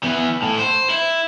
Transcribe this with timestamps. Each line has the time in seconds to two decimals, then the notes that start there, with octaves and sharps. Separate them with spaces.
0.03 E3 B3
0.42 A2
0.59 C5
0.90 E4